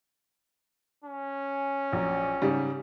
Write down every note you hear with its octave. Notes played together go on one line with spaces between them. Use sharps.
C#4
A#1 F#3
G#2 C#3 G3